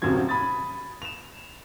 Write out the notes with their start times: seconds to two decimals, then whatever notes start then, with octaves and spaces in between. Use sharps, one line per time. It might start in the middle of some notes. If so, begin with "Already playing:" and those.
0.02 D#1 F#2 C3 D#3 F#3 G#6
0.29 B5 D#6 A6
1.02 E7 F7